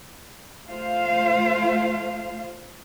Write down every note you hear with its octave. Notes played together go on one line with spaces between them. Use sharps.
A3 F4 C5 F5